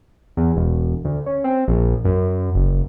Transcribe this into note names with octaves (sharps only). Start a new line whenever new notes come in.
E2
E1
D2
C#4
C4
A#1
F#2
F#1